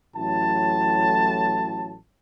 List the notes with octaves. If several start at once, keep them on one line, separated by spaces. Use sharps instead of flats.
A1 A2 F#3 A5